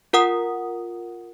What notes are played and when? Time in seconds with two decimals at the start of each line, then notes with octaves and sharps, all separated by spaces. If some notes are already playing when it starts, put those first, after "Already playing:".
0.13 F4 A#4 F#5 D#6